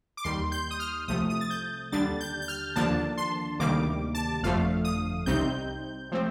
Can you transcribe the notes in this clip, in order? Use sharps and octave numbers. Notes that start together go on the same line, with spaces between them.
D6
D#2 D#3 G3 C6
G6
D#6
F6
C2 C3 F3 A3 D#6
D#6
A6
G6
D#2 D3 G3 D4 A6
G6
G6
F6
D#2 D3 F3 A#3 D4 A5
C6
D2 C3 D#3 G3 A#3 D6
A5
G1 F2 D3 F3 A3 F5
D#6
C2 C3 G3 C4 D#4 G6
F3 A3 C4